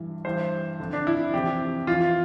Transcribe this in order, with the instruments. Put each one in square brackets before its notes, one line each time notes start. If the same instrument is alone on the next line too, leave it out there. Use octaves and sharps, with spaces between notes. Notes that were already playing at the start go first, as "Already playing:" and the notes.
Already playing: [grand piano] G2 E3
G2 E3 C5
F2 D3
D4
E4
F2 C3 E3 G4
F2 E3 F4